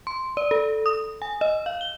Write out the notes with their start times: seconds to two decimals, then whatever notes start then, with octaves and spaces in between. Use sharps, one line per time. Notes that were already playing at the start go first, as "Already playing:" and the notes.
0.07 C6
0.37 D5
0.51 A4
0.86 D#6
1.22 G#5
1.41 D#5
1.66 F5
1.81 G7